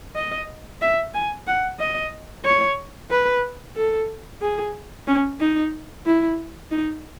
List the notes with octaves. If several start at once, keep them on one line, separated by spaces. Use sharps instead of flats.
D#5
E5
G#5
F#5
D#5
C#5
B4
A4
G#4
C#4
D#4
E4
D#4